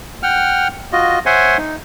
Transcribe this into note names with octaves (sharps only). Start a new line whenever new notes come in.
F#5 G5 F6
F4 F#4 D#5
C5 C#5 E5 F#5 G#5 C6
D#4